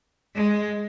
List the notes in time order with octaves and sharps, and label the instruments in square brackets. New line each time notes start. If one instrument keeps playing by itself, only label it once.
[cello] G#3